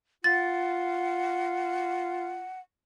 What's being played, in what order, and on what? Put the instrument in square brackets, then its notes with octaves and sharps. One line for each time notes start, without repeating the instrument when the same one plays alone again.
[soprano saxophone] F4 [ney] F#5 [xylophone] A6